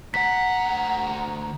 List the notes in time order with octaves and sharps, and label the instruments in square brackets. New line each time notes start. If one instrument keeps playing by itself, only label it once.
[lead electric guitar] D2 F#5 [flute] A#5 [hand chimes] B6